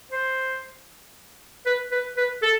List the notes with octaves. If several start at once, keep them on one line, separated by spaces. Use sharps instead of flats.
C5
B4
B4
B4
A4